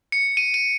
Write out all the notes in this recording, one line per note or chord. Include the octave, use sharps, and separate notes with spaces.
C#7
D#7
D#7